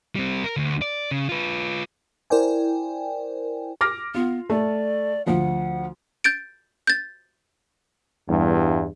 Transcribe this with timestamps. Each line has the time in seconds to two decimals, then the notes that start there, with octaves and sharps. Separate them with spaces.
0.15 G3 C4
0.44 A#4
0.57 D2
0.82 D5
1.11 C#3
1.29 F4 B4
2.30 E4 A#4 C5 D5 G5 G#5
3.81 D6 F6 A#6
4.15 B3 F4
4.50 A3 D5
5.26 D2 F3 F#5
6.24 G6 A6 D7
6.87 G6 A6
8.29 E2 G2